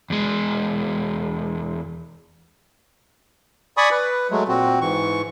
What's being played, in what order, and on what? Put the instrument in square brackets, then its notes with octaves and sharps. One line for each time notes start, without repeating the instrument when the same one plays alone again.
[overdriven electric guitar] E2 G#3
[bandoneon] D5 G#5 B5 C#6 D#6
B4
F#3 G#3 A3
A#2 C4 F#4
G#2 E3 C#6